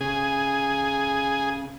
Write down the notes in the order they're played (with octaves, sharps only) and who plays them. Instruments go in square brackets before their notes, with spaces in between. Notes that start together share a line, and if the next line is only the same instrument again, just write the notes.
[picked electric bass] C#3 [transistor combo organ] G#4